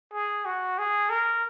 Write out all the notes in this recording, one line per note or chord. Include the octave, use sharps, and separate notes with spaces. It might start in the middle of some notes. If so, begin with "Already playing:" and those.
G#4
F#4
G#4
A#4